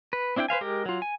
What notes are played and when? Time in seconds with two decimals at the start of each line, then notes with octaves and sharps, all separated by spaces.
0.13 B4
0.36 C4 D4 E4 E5 G5
0.48 B4 C5 F5 G#5
0.61 G#3 G4 A#4
0.86 F#3 F4
1.02 G#5